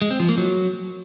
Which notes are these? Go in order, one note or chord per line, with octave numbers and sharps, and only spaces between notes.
G#3
C4
F3
A#3
F#3